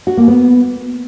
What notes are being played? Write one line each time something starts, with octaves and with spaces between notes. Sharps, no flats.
F#4
A#3
B3